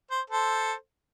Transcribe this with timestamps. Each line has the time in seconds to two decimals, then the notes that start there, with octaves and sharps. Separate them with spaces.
0.11 C5
0.30 A4 C5